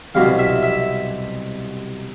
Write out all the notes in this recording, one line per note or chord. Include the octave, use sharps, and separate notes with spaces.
C2 B2 F#3 F5
E5
E5